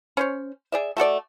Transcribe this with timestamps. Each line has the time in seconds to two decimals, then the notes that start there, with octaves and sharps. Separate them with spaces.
0.17 C#4 C5 C#5
0.72 G#4 D5 E5
0.97 A3 F#4 A4 D5